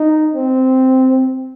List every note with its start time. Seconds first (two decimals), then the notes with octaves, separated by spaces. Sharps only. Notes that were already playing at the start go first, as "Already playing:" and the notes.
Already playing: D#4
0.34 C4